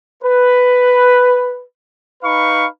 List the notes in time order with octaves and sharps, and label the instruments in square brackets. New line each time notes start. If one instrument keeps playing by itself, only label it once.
[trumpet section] B4
D#4 B4 F5 B5 C#6